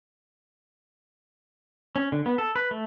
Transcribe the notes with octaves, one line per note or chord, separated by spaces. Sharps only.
C#4
D3
B3
A4
B4
A3